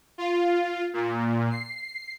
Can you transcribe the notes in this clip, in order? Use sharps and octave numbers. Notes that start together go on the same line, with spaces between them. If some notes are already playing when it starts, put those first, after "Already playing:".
F4
A#2
C7